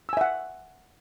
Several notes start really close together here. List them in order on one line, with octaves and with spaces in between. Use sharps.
E6 G#5 E5 F#5